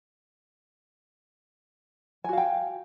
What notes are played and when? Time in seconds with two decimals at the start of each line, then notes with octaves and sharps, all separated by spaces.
2.24 G#5
2.29 F#4
2.33 F5
2.37 G5